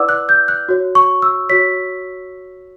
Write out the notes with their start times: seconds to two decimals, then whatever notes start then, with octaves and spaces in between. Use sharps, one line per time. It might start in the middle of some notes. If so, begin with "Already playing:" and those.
Already playing: E4 B4 D5 F#5 D6 E6
0.09 F#6
0.29 G6
0.48 F#6
0.69 F#4 C#5
0.95 C#6
1.22 E6
1.50 F#4 C#5 B6